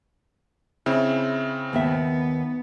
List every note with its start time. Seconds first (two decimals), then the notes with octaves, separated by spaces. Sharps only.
0.86 C#3 C4 E4
1.73 D#2 B3 E5